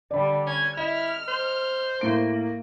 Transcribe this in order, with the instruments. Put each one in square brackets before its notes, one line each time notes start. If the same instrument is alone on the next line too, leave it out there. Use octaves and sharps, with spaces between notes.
[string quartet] D3 G3 [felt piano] D5 B5
[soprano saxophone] C#4 [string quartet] G#6
[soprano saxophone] E4 [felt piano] D#5 [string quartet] F6
[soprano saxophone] C5
[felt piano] A2 D7 [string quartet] A#3